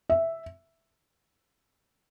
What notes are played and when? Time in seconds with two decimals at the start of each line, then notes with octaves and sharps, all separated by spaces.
0.10 E5